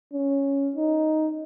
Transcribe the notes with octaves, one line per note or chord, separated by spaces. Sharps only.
C#4
D#4